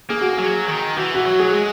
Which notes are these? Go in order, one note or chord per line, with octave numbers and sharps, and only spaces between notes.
A#3 G#4
F#4
G#4
F#3
D#3
E3 F#4
F#4
F#3
G#4
G#3